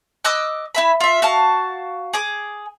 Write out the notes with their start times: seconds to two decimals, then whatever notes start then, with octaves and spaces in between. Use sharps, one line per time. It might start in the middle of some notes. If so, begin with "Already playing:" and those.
0.24 D#5 D6 E6 F#6
0.75 E4 E5 B5
1.00 F4 E5
1.22 F#4 F5 A5
2.13 G#4 D6